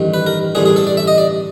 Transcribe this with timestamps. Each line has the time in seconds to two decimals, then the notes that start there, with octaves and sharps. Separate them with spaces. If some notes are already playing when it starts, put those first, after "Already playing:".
Already playing: A1 G2 D#3
0.14 B4
0.26 A#4
0.55 A1 G2 D3 G#4
0.66 G#4
0.76 A4
0.87 D5
0.97 E5
1.08 D#5
1.18 D5